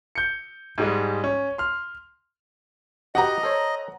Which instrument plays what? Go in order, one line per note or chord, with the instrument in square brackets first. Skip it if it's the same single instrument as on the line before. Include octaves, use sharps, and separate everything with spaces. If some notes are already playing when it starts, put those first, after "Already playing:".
[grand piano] G6 C#7
G#2 G3 G#3
C#4
C6 F6
[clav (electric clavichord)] F#4 G4 B4 [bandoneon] D#5 [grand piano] F#5 A#5
[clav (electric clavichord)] A4 C5 C#5